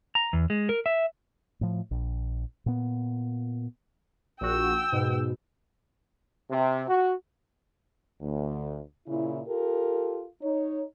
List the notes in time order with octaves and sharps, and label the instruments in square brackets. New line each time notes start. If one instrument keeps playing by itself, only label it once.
[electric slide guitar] A#5
E2
G#3
A#4
E5
[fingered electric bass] A2 F3
A#1
A#2 B3
[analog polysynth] A#1 F#4 [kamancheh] G5 E6
[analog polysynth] G#2 B2
[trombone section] C3
F#4
[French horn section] D2
A#2 C#3 E4
F4 G4 A4 A#4
D#4 C#5